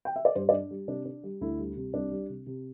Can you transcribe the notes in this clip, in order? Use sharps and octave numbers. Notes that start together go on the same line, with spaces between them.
G5
E5
D5
G2 C5
D5
D4
G3
C3 D4
D4
G3
D2 E4
G3
C3
C2 D4
G3
C3
C3